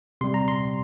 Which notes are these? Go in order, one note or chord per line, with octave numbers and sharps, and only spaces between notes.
C3 G3 C6
A#5
C6